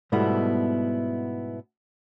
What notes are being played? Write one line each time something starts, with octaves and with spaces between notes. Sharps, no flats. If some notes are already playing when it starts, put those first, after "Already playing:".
G#2 B2 G3 A3 B3 E4